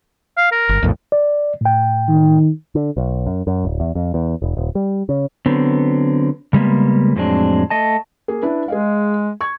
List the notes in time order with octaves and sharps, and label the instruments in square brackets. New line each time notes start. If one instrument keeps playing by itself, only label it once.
[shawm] F5
A#4
[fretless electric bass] G1
B1 F2 A2
[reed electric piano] D5
A2 G5
[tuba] D#3
[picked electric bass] D3
B1
F#2
F#2
D1
E2
F2
E2
E1
D#1
G3
C#3
[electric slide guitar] D3 F#3 B3 C4
C#3 G3 G#3 A#3 B3
F2 A2 F#3 G#3 C4 D4
A3 D#5 A5
[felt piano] A#3 G#4
D4 E4 B4
[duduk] G#3 [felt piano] G#4 D#5 F5
[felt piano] C#6 G#6